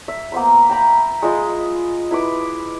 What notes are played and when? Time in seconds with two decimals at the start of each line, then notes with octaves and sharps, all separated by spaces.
0.08 E5
0.32 A#3 B3 C5 B5
0.70 G5 A#5 B5
1.22 G#3 F4 D#5
2.11 E4 B4 D6